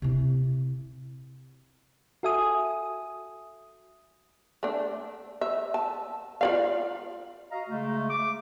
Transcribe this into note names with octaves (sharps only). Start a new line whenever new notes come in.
C3 E4
F#4 A4 E5 G#5 D#6
A3 D4
E5
A5
F4 D5 F5
F#4 D#5 F5 A#5
C#3 G#3 A3
D6